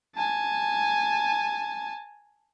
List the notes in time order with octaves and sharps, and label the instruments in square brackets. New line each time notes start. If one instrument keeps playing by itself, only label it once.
[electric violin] G#5 A5